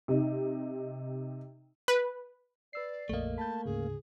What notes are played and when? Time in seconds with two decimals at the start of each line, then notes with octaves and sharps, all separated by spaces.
0.08 C3 D#4
1.88 B4
2.73 B4 D5 E6 C7
3.10 A#1 F2 A3 A#3 D#5
3.38 A5 B5 G6
3.65 D2 G#2 C#3 G#4